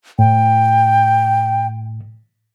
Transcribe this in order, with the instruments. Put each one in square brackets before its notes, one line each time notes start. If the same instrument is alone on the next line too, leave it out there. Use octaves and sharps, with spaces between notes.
[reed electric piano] A2 [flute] G5